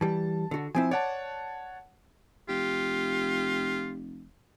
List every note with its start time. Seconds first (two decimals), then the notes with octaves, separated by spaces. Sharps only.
0.01 E3 G3 A5
0.51 D3 F#4
0.75 F3 C4 E4 G#5
0.91 C#5 D5 F#5 A5
2.49 F1 F4 G4